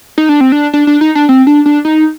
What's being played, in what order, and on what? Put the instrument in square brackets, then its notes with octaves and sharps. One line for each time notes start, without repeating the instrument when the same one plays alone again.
[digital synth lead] D#4
D4
C4
D4
D4
D4
D#4
D4
C4
D4
D4
D#4